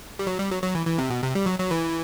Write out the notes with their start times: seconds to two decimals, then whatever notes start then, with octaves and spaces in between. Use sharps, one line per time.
0.19 G3
0.27 F#3
0.39 G3
0.51 F#3
0.63 F#3
0.75 E3
0.87 E3
0.98 C3
1.10 B2
1.22 C3
1.35 G3
1.46 F#3
1.59 F#3
1.71 E3